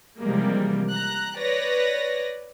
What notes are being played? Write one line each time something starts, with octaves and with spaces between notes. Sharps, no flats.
C3 E3 F3 G3 G#3 A#3
A#5 F#6
B4 C#5 D5 A#6